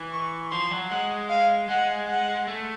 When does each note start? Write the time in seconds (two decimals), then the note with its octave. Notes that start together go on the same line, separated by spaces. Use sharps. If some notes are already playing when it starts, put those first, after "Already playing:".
Already playing: E3
0.13 C#6
0.51 F3 C6
0.71 F#3
0.90 G#3 F#5
1.29 F5
1.68 G#3 F#5
2.08 F#5
2.48 A3